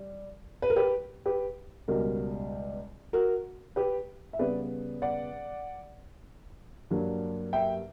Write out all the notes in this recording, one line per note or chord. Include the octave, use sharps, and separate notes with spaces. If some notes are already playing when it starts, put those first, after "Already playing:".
Already playing: G3
B4
A#4
G4 B4
G4 B4
C#2 B2 G3 F#4 A#4
F#4 A#4
G4 B4
E5
C#3 G3 B3 B4 D5
D5 F#5
G2 F#3 A#3 D4
E5 G5